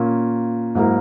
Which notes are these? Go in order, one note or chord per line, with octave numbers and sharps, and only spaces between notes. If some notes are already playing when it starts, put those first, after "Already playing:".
Already playing: A#2 A#3 C#4
G#2 F#3 A#3 E4 A#4